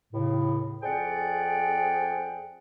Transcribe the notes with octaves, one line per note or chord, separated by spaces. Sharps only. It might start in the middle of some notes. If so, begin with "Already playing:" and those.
D#2 A2 C#3
F2 G#4 C5 D5 F#5 G5